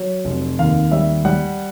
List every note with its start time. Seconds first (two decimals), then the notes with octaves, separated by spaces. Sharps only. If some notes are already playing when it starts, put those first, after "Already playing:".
Already playing: F#3
0.25 F1
0.59 D#2 F5
0.92 G3 E5
1.25 G3 F#5